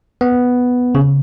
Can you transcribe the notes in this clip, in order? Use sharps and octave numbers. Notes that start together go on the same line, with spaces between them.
B3
C#3